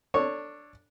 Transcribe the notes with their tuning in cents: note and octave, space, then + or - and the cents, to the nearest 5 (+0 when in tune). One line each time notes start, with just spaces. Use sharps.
D4 +0 A4 +25 C#5 -10